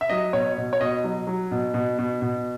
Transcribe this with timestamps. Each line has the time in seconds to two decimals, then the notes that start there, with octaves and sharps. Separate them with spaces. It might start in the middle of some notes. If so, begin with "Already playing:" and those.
0.01 E5
0.10 F#3 D#5
0.33 B2 C#5
0.58 B2
0.73 C#5
0.81 B2 D#5
1.04 F#3
1.27 F#3
1.51 B2
1.74 B2
1.99 B2
2.22 B2